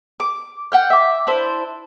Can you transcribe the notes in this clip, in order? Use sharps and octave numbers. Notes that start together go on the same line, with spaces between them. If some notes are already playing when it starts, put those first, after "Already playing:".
D6
F#5 G5 F6
E5 D6
D4 E4 C5